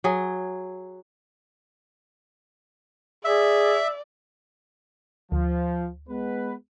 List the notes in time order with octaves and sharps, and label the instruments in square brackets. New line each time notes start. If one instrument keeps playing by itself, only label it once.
[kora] F#3 G#4
[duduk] G#4 [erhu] D5 [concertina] E5
[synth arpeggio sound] D2 [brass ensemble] F3
[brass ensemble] G#3 B3 B4